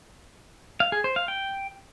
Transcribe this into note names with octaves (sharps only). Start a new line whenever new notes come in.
F5
G#4
C5
F5
G5